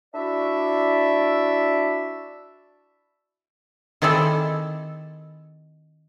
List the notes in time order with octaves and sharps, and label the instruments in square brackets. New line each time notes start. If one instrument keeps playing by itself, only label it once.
[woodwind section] D4 E4 F#4 D5 E5
[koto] D#3 C4 E4 G#4 A4 D5